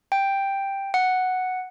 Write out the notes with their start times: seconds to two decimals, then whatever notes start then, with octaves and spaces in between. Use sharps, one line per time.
0.12 G5
0.94 F#5